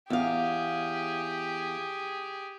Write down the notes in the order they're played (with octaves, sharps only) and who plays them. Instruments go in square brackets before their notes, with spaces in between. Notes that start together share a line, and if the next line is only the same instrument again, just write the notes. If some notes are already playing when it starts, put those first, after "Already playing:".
[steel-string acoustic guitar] E2 F5 [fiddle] G4 G#4